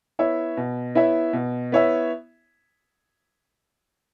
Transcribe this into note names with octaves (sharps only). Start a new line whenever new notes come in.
B3 E4 C#5 E5
B2
B3 E4 C#5 E5
B2
B3 E4 C#5 E5